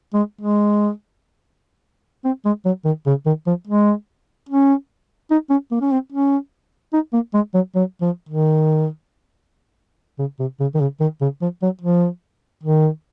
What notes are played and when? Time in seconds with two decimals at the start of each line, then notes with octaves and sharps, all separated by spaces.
0.14 G#3
0.41 G#3
2.25 C4
2.45 G#3
2.65 F#3
2.85 D#3
3.07 C#3
3.26 D#3
3.47 F3
3.67 G#3
4.49 C#4
5.31 D#4
5.50 C#4
5.71 A#3
5.81 C#4
5.91 C4
6.12 C#4
6.93 D#4
7.13 A#3
7.34 G#3
7.54 F#3
7.75 F#3
8.01 F3
8.29 D#3
10.19 C#3
10.40 C3
10.60 C#3
10.74 D#3
10.80 C#3
11.00 D#3
11.21 C#3
11.41 F3
11.62 F#3
11.82 F3
12.63 D#3